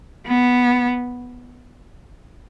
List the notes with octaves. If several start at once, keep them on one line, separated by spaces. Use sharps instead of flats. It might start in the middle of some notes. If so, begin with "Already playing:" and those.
B3